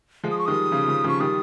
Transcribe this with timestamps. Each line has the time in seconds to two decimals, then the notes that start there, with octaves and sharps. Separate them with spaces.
0.24 F3 G#3
0.31 D#6
0.39 C#6
0.46 D#3 G3 D#6
0.72 C#3 F3
0.88 C#3 F3
1.04 C#3 F3 C#6
1.20 D#3 G3 D#6